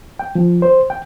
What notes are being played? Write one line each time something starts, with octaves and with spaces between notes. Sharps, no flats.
G5
F3
C5
G5